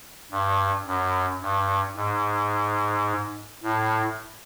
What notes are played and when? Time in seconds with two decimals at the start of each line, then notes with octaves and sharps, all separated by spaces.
0.31 G2
0.87 F#2
1.42 G2
1.97 G#2
3.63 A2